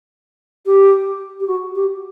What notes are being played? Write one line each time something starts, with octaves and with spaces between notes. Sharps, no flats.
G4
G4
F#4
G4